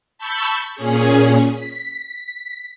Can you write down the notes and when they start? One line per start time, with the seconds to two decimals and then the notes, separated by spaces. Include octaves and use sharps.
0.18 A5 B5 C#6 E6 G6
0.76 A#2 C#4 G#4
1.53 B6